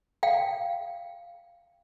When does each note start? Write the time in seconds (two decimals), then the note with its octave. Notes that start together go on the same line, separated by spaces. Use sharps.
0.23 F5 G5